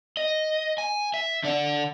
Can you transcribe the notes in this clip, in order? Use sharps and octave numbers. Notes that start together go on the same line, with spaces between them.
D#5
G#5
E5
D3 D5